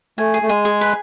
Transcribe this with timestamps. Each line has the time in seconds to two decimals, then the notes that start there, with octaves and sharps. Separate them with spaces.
0.18 A3 G#5
0.34 G#4
0.42 A3
0.49 G#3 G#5
0.65 G#4
0.81 B4